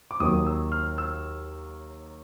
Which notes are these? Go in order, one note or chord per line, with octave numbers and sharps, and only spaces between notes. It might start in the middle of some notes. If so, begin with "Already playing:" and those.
D6
D#2 D#3 F#3 A#3 D#6
E6
F6
E6